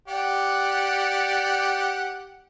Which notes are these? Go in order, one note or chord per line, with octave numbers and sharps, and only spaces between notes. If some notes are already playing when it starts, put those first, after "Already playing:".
G4 D5 F#5